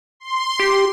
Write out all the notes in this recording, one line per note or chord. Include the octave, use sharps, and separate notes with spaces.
C6
G4